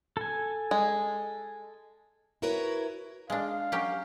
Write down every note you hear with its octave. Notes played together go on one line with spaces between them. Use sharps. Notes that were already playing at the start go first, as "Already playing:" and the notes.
A4 G#5
G#3
E4 F#4 A#4 B4 C#5
G#3 D4 F5
F#3 C#4 G4